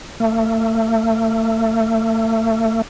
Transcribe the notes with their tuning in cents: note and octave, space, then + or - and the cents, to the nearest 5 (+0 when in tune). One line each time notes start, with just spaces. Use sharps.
A3 +35